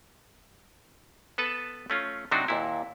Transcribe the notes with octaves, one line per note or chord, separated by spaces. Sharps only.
B3 A4 B4 A5
A3 C#4 F4
C3 F#3 D4 D#4 F#4
D#2 A#2 E4